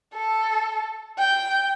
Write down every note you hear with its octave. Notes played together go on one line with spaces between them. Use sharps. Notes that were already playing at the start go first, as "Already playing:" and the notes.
A4
G5